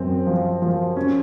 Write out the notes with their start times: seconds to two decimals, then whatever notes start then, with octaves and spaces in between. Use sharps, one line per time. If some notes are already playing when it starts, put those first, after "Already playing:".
Already playing: F#2 C4
0.27 F3
0.62 F3
0.96 C#4